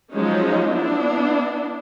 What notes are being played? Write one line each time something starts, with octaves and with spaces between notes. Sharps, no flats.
F3 F#3 G#3 C#4 D#4
B3 D4 E4